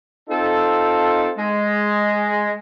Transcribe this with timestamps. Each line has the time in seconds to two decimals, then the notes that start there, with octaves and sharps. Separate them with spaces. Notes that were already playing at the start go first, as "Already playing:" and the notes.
0.30 C4 D#4 F4 A4
1.38 G#3